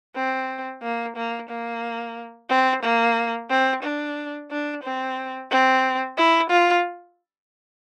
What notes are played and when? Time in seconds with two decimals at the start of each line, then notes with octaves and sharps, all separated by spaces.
0.16 C4
0.83 A#3
1.17 A#3
1.50 A#3
2.50 C4
2.83 A#3
3.50 C4
3.83 D4
4.51 D4
4.83 C4
5.51 C4
6.17 E4
6.50 F4